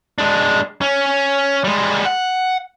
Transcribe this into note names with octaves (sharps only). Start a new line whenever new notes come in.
G#3 D4
C#4
G3 G#3
F#5